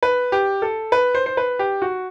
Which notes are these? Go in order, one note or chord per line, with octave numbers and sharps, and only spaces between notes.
B4
G4
A4
B4
C5
C5
B4
G4
F#4